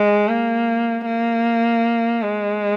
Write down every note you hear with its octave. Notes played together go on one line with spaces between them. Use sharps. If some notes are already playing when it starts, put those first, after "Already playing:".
Already playing: G#3
A#3
A#3
G#3